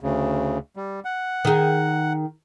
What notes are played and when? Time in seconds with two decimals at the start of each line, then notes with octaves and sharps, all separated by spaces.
0.01 D2 C#3
0.76 G3
1.05 F#5
1.45 D#3 G#4